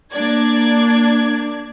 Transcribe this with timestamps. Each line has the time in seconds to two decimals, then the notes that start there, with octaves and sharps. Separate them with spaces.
0.12 A#3 D4 D5 G#6